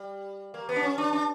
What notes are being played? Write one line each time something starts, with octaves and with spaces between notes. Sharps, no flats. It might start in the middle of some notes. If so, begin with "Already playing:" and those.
Already playing: G3
A#3
B3
D4
C#4
D4
D4